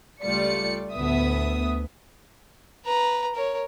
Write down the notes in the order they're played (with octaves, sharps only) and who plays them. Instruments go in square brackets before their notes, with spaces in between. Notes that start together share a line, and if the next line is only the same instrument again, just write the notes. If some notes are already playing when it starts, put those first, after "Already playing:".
[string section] C#2 G3 A3 F4 D5 C#7
D2 A2 B3 E5 D#6
[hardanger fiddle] B4 A#5
A#4 C#5